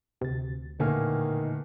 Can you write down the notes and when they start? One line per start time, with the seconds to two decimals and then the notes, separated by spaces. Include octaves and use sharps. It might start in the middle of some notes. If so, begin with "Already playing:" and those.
0.21 D2 C3 A6
0.80 E2 A#2 D3 D#3 A3 A#3 G#5 F6